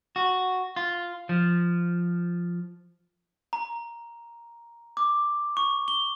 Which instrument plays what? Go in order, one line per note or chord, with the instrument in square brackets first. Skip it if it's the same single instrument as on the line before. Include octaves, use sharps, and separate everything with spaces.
[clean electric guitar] F#4
F4
F3
[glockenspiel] A#5
D6
C#6
G7